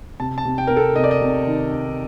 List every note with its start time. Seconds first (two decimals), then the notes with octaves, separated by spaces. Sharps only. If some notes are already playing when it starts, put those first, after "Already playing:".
0.20 C3 A5
0.38 A5
0.45 C3
0.58 G5
0.67 C3 A#4
0.77 A4
0.96 C3 D#5
1.04 D5
1.11 D#5
1.21 C3
1.47 D#3
1.73 D#3